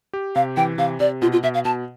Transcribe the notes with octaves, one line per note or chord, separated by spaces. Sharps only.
G4
C3 F5
E3 G5
C3 F5
C3 D5
B2 F4
F4
B2 E5
F5
B2 A5